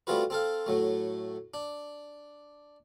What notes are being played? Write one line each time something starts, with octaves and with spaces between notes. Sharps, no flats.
G3 A3 C4 F4 F#4 B4
C4 A4 F5
A2 F#3 A3
D4